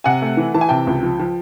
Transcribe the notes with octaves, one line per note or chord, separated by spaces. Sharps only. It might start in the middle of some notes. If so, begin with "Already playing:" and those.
C3 F#5 G#5
A3
E3
E3 A5
G#5
C3 G5 A5
C#2
F3
F3